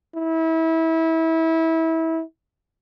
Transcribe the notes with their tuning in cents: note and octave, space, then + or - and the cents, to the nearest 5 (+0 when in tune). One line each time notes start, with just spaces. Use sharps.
E4 -25